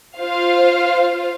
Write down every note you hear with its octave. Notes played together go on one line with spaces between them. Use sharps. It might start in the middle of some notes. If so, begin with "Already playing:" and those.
F4 C5 F5